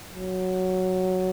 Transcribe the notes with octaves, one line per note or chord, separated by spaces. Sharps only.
F#3